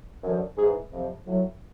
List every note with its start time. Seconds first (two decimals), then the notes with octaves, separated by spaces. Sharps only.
0.23 F#2 D3 F3
0.57 G#2 G#4
0.60 E3
0.92 F2 C3 F3
1.25 A2 F#3